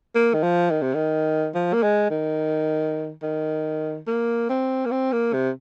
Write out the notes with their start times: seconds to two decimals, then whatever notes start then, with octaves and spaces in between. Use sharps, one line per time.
0.15 A#3
0.34 D#3
0.43 F3
0.71 D#3
0.82 C3
0.94 D#3
1.55 F3
1.74 A#3
1.83 G#3
2.11 D#3
3.23 D#3
4.07 A#3
4.50 C4
4.86 A#3
4.91 C4
5.13 A#3
5.33 C3